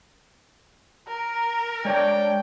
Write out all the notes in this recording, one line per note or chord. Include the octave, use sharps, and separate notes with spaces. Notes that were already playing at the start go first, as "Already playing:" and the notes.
A#4 A#5
G#3 D4 C#5 D5 G5